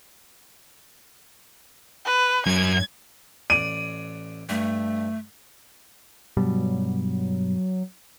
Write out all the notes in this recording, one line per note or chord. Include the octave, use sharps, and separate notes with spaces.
B4
F#2 G#6
A1 D5 D#7
G2 A3
G2 B2 F#3 G3